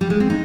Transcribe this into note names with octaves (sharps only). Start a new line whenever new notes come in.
G3
G#3
C4
D#4